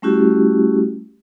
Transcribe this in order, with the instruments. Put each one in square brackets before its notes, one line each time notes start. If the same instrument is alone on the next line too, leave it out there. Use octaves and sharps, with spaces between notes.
[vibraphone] G3 A3 C#4 E4 F#4 G4